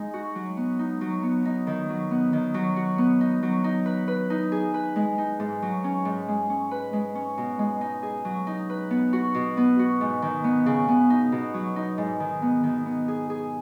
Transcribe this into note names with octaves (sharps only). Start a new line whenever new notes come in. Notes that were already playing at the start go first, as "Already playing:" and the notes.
Already playing: G#3 D#4
F#4
F#3
B3
D#4
F#3
B3
D#4
D#3
F#3
B3
D#3
F#3
F#4
B3
D#4
F#3
D#4
B4
B4
D#4
G#4
B4
G#3
D#4
G#2
F#3
C#4
G#2
G#3
C#4
B4
G#3
C#4
B2
G#3
D#4
G#4
F#3
D#4
B4
B3
F#4
B2
B3
F#4
G#2
D#3
B3
C#3
B3
D#4
B2
F#3
D#4
G#2
D#3
B3
D#3
B3
G#4
G#4